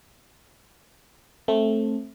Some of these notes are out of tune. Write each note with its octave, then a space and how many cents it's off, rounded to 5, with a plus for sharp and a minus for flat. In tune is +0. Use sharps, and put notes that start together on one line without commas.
A3 +0 C4 +25